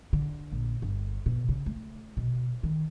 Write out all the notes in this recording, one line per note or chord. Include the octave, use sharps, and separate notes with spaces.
D3
A#1
G1
B2
C#3
A3
B2
D#3